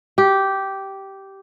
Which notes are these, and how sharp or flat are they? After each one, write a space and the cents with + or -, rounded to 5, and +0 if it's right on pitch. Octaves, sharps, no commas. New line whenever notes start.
G4 -10